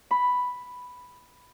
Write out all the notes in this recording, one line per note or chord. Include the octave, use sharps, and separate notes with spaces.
B5